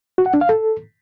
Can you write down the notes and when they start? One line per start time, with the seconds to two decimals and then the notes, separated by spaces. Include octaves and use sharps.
0.18 F#4
0.26 F#5
0.34 D4
0.41 F5
0.49 A4